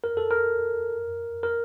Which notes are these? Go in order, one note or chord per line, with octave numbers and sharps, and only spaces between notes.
A#4
A4
A#4
A#4